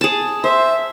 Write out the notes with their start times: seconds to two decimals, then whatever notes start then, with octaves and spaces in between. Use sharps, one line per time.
0.01 G#4 A5
0.44 C5 E5